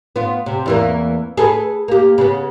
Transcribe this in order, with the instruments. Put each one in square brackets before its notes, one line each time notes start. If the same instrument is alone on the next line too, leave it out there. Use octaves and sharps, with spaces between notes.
[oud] B3 F4
C3
E2 E3 A#3
G#4 A4 B4
A#3 G4
C#3 B3